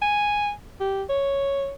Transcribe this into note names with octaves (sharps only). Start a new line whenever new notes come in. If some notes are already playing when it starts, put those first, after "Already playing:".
G#5
G4
C#5